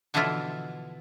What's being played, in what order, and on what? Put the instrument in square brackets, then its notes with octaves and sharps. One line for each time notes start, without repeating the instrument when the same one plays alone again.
[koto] B2 D3 E3 F3 E4 F4